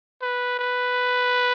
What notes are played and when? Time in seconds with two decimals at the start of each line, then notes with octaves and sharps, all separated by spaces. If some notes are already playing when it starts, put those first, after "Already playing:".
0.22 B4
0.59 B4